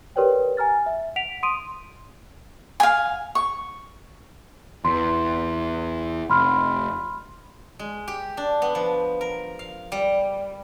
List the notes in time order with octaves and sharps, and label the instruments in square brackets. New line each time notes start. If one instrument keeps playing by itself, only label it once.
[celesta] G4 A#4 B4 C#5 D5 G5
G#5 A#5 F6 A6
E5
F#5 B6 D7 F7
C6 D#6 D7 D#7
[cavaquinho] F5 G#5
C#6
[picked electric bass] E2 E3 [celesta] C6
[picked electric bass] F1 [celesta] B5 C6 F6
[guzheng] G#3
G4
D4
B3
F3
A#4
F5
G3